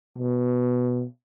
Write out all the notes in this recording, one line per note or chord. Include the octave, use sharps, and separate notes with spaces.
B2